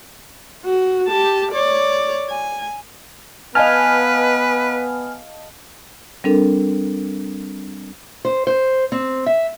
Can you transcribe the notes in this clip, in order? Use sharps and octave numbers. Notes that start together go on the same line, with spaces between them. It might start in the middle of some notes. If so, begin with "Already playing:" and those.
F#4
G4 A5
C#5 D5
G#5
B3 B4 D#5 F5 G#5 A5 F6
G3 C4 D4 A4 A#4
C5
C5
C4
E5